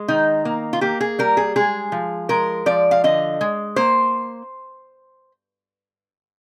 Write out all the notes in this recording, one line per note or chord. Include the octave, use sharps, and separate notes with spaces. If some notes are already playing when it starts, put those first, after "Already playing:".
Already playing: G#3
D#3 D#4
A#3
F4
A#3 G4
G#4
G3 A#4
G#4
G#3 G#4
F3
G#3 A#4
F3 D5
F5
D3 D#5
G#3
A#3 C5